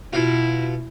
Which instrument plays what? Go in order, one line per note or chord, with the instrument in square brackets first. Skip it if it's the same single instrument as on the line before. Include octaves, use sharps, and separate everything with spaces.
[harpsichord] B2 F4 [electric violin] E4